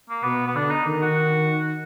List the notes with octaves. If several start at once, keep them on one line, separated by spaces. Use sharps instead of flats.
A#3
B2 B3
B3
D3 D4
D#4
D#3
F#4